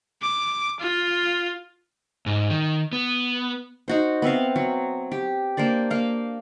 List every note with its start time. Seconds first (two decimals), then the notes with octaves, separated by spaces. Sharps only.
0.22 D6
0.80 F4
2.26 G#2
2.50 D#3
2.93 B3
3.88 D#4 F#4 C5
4.22 B3 C4 E5 F5
4.56 F#3
5.12 G4
5.57 A#3 D4 C5 D5
5.90 A#3 F5